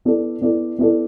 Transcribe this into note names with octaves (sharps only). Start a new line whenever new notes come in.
B3 E4 A4 D5
B3 E4 A4 D5
B3 E4 A4 D5